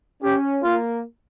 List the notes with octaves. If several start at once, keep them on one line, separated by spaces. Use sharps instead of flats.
C#4 G4
A#3 F4